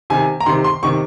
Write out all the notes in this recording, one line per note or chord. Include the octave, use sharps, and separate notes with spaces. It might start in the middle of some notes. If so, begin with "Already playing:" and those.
C3 D#3 G#5
A#5
C3 D#3 C6
C6
C3 D#3 C#6